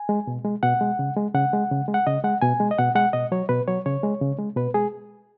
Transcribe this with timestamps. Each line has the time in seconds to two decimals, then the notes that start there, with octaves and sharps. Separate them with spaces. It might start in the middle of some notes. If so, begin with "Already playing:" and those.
Already playing: G#5
0.09 G#3
0.27 B2
0.45 G#3
0.63 B2 F#5
0.81 G#3
0.99 C#3
1.17 G#3
1.34 C#3 F#5
1.53 G#3
1.71 C#3
1.88 G#3
1.94 F#5
2.07 C#3 D#5
2.24 G#3 F#5
2.42 B2 G#5
2.60 G#3
2.71 D#5
2.79 B2 F#5
2.95 G#3 F#5
3.13 B2 D#5
3.32 F#3 C#5
3.49 B2 B4
3.68 F#3 C#5
3.86 C#3 C#5
4.03 G#3
4.21 C#3
4.39 G#3
4.57 B2 B4
4.74 G#3 G#4